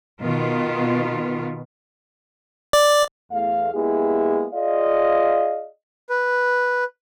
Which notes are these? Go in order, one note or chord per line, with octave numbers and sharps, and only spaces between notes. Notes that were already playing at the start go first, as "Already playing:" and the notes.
B2 D#3 B3 F4
D5
E2 A3 F5
G#3 A#3 B3 E4 G4 G#4
F4 G#4 D5 D#5 F5
B4